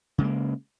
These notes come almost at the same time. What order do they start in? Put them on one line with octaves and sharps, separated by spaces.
C#3 G#3 A#3